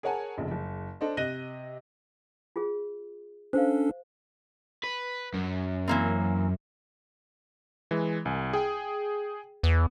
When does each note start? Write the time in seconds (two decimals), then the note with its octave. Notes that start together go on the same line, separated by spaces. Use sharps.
0.03 G#4 A#4 C#5 F#5 G#5 A5
0.38 F1 A#1 C#3
0.51 F#1
1.01 D4 A4 C5 D#5
1.17 C3 D#5 F#6 A#6 D#7 G7
2.56 F4 G#4
3.53 C#4 D4 A4 C5 F5
4.83 B4
5.34 F#2
5.88 E3 A#3 C4
7.91 E3 G#3
8.25 C2 G#5
8.53 G#4 G5
9.63 E2 B3